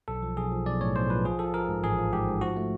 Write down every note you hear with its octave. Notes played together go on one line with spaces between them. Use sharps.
B1 A4
F3
B1 G#4
F3
B1 D5
A2 C#5
B1 C5
F3 B4
F3 G#4
F3 A4
F3 A#4
G#2
A1 G#4
F3
G#2 G4
G#2
F3 F#4
A3